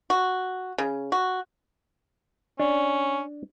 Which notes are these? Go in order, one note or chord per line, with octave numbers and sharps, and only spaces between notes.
F#4
C#3
F#4
C#4 D4